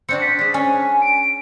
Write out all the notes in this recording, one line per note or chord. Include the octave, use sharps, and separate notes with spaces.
C4 D4 F#4 C#7
B6
D4 G#4
C#4 D4 G#5
D7